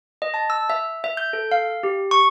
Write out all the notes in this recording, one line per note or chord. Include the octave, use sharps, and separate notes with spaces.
D#5
A5
E6
E5
E5
G6
A4
F5
G4
C#6